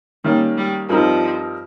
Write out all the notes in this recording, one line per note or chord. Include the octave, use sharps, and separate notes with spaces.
D#3 G3 A#3 C#4
G3
G2 F3 G3 C4 D#4 A#4